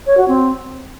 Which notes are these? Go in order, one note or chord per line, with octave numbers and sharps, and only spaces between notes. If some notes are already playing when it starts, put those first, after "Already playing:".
C#5
F#4
C4